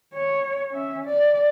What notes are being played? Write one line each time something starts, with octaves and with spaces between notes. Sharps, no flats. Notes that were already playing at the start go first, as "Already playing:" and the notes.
C#5
C#4 E5
D5